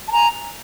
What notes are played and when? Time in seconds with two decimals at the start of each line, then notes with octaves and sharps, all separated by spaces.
0.06 A5
0.13 G#5 A#5